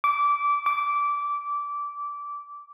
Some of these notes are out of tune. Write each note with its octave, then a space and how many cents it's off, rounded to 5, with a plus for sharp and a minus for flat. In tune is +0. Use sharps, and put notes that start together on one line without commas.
D6 -20
D6 -15